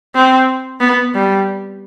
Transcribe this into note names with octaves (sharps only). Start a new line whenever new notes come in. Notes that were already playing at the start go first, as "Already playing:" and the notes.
C4
B3
G3